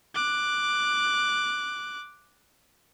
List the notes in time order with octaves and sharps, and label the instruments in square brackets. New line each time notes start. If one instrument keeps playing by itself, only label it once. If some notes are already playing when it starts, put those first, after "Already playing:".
[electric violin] D6 F#6